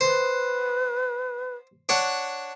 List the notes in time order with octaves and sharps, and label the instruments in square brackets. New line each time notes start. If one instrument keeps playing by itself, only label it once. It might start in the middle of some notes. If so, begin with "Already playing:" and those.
[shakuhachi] B4 [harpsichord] C5
[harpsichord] D4 C#5 F#5